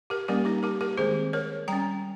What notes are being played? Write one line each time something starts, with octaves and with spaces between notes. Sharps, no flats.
G4 A#4
G3 A#3 C#4 G4 A#4
D#4 G4
G4 A#4
G4 A#4
D#3 G#3 C4 G#4 C5
A#4 C#5
G3 C#4 G5 A#5